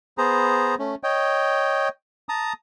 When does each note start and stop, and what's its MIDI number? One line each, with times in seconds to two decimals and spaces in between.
0.18 0.75 59
0.18 0.75 68
0.18 0.75 72
0.18 0.75 82
0.79 0.95 57
0.79 0.95 61
1.03 1.88 73
1.03 1.88 75
1.03 1.88 79
2.29 2.53 81
2.29 2.53 82
2.29 2.53 87